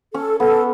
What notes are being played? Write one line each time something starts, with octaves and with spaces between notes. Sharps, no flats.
C#4 A4
B3 A4